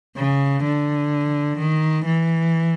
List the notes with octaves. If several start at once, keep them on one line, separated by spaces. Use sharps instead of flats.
C#3
D3
D#3
E3